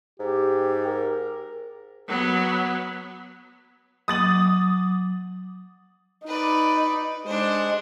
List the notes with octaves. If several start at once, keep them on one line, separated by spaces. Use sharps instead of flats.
G#2 G4
A#4
F#3 B3
F#3 D6 D#6 A6 F#7
D#4 B4 D5
G#3 D4 C5